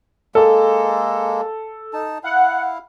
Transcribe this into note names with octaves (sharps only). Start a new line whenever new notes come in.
G#3 A#3 A4
D#4 A5
E4 F5 F#5